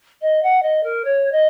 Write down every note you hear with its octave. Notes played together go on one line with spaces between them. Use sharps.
D#5
F#5
D#5
A#4
C#5
D#5